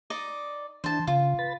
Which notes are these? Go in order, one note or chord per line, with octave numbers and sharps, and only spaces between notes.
D#4 D5 D#5
E3 D4 C5 A5
C#3 F4
B4 B5 A6